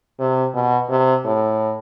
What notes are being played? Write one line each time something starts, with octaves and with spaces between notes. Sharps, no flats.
C3
B2
C3
A2